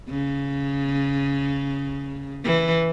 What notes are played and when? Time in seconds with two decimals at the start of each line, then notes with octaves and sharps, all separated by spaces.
0.10 C#3
2.44 E3